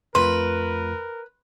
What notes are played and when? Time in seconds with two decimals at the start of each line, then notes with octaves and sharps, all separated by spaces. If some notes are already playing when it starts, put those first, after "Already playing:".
0.15 F2 A3 F4 A#4 B4 C6